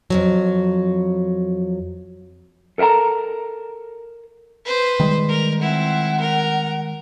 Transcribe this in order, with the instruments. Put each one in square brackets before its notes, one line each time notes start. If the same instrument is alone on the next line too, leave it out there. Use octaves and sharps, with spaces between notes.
[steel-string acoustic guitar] F2 G#2 F#3
[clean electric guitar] A4 A#4 E5 A5 A#5
[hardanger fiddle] B4 C5
[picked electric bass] D#3 G3 G#3
[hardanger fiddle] A#4
[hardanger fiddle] C4 E4 [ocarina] F#5
[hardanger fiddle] A#4